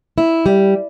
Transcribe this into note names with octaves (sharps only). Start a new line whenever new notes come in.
E4
G3